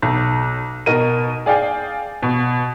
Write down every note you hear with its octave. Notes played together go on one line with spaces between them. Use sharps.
B1
B2 D#4 A#4 D#7
G#4 D5 F5 G5
B2